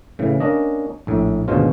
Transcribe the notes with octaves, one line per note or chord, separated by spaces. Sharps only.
A2 C#3 E3
A#3 C#4 D4 D#5
A#1 A2
G#1 D2 G#2 B2 C#4 F4